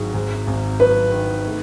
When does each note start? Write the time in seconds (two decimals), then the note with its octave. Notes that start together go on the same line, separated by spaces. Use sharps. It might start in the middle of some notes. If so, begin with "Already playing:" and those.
Already playing: G#1 G#2 D#3 F#3 G#4
0.14 G#2
0.47 G#1
0.80 F#3 B4
1.12 D#3
1.45 A3